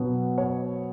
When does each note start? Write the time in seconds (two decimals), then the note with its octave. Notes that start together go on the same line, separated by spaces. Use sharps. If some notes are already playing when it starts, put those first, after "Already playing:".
Already playing: B2 F#3 B3
0.38 C#5